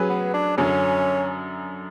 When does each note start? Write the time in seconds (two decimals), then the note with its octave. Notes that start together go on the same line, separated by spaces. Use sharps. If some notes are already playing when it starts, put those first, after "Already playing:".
Already playing: F#3 C#4 G#4 B4
0.10 B3
0.33 D4
0.57 F#2 D3 F#3 C#4